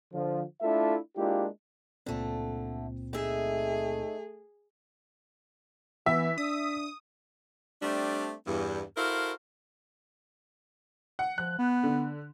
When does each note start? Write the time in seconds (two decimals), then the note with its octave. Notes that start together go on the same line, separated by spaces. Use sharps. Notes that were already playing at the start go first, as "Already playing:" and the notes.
0.13 D3 F3
0.62 A3 D4 E4 F4 A4 E5
1.17 G#3 A#3 D4 E4 F4 G4
2.06 C#2 A#2 D3 A3 C4
3.13 A3 D#4 G#4 E5
6.06 E3 B3 E5
6.38 D4 D#6
7.82 G3 A3 C4 D4
8.47 E2 G2
8.96 E4 F#4 A4 A#4 C5 F5
11.19 F#5
11.38 F3 F#6
11.58 B3
11.84 D3